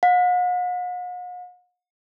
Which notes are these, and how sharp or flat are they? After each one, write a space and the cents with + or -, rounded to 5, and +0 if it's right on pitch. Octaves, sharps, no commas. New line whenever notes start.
F#5 -45